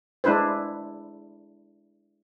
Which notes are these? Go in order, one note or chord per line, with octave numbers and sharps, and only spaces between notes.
G#3 D4 E4 B4 C5